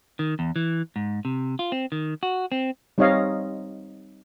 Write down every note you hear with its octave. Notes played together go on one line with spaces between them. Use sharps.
D#3
E2
E3
G#2
C3
F4
C4
D#3
F#4
C4
G3 C4 D#4 C#5 D#5 F5